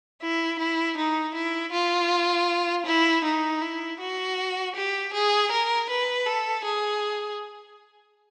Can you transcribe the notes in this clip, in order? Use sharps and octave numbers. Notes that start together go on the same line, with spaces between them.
E4
E4
D#4
E4
F4
E4
D#4
E4
F#4
G4
G#4
A#4
B4
A4
G#4